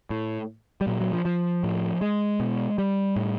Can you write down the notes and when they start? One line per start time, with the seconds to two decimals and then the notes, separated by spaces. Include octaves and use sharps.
0.10 A2
0.81 G3
0.87 A#2 F#3
1.00 F#3
1.13 F3
1.25 F3
1.64 A2
2.01 G#3
2.40 B2
2.78 G3
3.16 A2